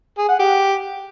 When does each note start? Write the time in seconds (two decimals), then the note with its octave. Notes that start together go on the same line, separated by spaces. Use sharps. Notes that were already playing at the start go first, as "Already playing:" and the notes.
0.18 G#4
0.29 F#5
0.39 G4